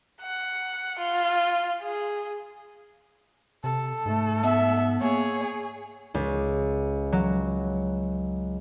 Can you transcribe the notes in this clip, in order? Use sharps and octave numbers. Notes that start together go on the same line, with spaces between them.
F#5
F4
G#4
C3 A4
G#2 A3
B3 E5
A#3 G#4 C#5
C#2
F#3